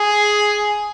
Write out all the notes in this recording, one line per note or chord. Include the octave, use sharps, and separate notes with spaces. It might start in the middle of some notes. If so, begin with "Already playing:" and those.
Already playing: G#4